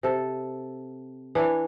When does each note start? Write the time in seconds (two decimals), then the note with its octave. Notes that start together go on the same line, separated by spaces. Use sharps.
0.03 C3 A4
1.35 E3 D4 E4 C#5